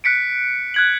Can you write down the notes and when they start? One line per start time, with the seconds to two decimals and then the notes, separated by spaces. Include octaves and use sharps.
0.04 F#6 B6 C#7 D7
0.74 F#6 G#6 F#7